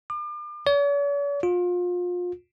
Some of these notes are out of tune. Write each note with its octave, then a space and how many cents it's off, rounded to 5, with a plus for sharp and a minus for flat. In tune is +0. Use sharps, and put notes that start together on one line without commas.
D6 +40
C#5 +45
F4 +30